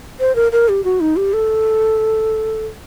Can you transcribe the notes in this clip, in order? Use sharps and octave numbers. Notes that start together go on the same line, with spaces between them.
C5
A#4
A#4
G4
F#4
D#4
G4
A4